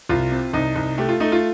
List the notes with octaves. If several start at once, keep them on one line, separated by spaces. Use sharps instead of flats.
C2 F4
C3
C2 D#4
C2
A3 G4
F4
A3 D#4
F4